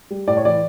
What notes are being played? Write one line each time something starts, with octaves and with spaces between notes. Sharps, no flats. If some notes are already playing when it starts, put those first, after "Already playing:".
G3
A2 D5
C#5
E3 D5